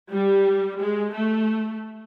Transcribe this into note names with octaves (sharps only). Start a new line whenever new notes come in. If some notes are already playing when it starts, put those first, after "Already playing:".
G3
G#3
A3